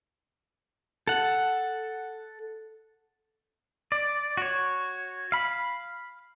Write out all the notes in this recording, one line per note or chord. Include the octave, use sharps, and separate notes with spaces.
A4 F#5
D5
F#4 C#5
F5 B5